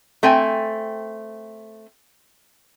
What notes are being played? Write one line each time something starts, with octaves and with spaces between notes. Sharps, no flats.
A3 C4 G5 G#5